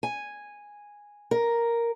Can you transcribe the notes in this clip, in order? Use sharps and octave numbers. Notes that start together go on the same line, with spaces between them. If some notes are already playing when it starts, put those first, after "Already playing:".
G#5
A#4